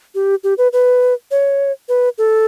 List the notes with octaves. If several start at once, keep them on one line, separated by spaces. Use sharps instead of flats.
G4
G4
B4
B4
C#5
B4
A4